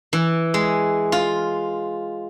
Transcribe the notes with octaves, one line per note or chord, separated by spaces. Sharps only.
E3
G#3
F4